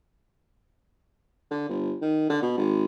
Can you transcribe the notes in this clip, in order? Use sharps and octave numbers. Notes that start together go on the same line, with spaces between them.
D3
G1
D#3
D3
B2
G#1